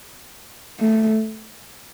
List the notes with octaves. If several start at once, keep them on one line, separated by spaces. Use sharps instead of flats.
A3